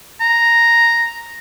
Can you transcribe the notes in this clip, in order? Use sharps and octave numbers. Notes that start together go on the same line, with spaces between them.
A#5